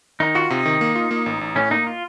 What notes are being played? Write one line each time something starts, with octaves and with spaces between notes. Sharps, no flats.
D#3 D#4
F4 F#4
C3 D#4
D#3
A#3
F4
A#3
A1
A1
A2 C#4
A#3 D#4
F4